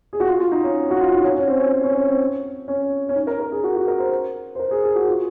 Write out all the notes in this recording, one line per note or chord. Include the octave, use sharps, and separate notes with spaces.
G#4
F#4
F4
F4
D#4
C#4
F#4
F4
D#4
C#4
C#4
C4
C#4
C#4
C#4
C#4
C4
C#4
C#4
D#4
A#4
A#4
G#4
F#4
F#4
A#4
C5
C5
A#4
G#4
G#4
F#4
F4